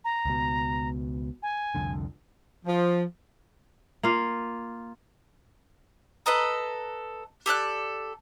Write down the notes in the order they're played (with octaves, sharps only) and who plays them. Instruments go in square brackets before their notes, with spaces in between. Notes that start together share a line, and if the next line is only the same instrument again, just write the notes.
[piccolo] A#5
[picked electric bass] C#2 B2
[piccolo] G#5
[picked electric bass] C2 F2 D3
[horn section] F3
[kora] A#3 F4
[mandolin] A4 B4 D#5 A#5
G4 A4 D5 F#6